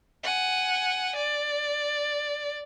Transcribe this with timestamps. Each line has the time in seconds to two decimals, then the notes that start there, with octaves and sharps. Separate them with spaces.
0.23 F#5 G#5
1.16 D5